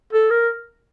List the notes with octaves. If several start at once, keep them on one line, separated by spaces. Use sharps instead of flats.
A4
A#4